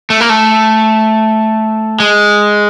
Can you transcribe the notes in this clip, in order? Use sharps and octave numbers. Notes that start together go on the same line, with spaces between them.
A3
A#3
A3
G#3